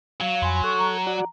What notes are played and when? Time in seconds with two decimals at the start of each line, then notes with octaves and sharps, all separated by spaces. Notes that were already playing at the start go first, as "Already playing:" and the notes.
0.21 F#3 F5
0.42 F2 G#5 B5 C6
0.64 A4 C#6 F#6
0.79 A#5
1.07 F#4 D5 F#5